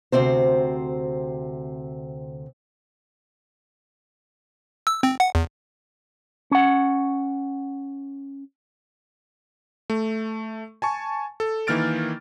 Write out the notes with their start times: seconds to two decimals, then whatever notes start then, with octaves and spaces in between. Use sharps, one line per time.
0.12 D2 C3 C4 C5
4.87 E6
5.03 C4
5.20 F#5
5.35 E2
6.51 C#4 F#5
9.90 A3
10.82 G#5 A5 C#6
11.40 A4
11.67 D#3 E3 A#3 F6 A6 D7